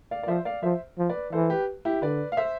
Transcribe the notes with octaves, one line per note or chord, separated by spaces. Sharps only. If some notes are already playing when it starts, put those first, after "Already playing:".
D5 F5
D5
F3 C5 E5
D5 F5
F3 C5 E5
F3
B4 D5
E3 A4 C5
G4 B4
E4 G4
D3 B4 D5
F5
C5 E5